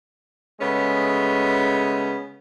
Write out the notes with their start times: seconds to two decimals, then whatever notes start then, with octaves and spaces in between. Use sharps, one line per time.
0.61 C#3 G#3 A3 B3 C#4